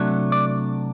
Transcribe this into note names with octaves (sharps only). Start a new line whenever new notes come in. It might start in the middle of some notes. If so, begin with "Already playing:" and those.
Already playing: C3 F#3 A3 D4
D5